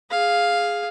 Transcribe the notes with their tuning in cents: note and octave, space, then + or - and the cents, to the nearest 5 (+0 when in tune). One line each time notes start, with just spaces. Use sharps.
G#4 +0 F5 +0